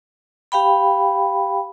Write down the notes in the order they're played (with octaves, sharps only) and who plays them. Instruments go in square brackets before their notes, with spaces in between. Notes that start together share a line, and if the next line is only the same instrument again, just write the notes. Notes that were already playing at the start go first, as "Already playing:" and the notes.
[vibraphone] G4 F5 G5 B5